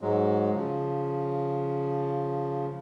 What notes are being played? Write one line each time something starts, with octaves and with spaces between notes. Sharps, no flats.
G#2 F#3 G#3
C#3 F3